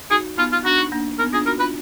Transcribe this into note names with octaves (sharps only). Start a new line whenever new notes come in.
D#4 F#4 G#4
B3 D#4 F4
F4
D4 F#4
D#4
A#3 D4
B3 D#4 A#4
D4 F4 G#4
D#4 F#4 A#4
D4 F4 B4